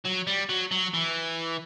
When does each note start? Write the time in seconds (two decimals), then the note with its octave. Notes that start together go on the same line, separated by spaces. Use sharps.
0.05 F#3
0.27 G3
0.49 F#3
0.72 F#3
0.94 E3